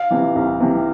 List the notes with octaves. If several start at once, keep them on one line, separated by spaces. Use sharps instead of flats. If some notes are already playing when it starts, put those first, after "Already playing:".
Already playing: F5
C3 E3
C2
C3 E3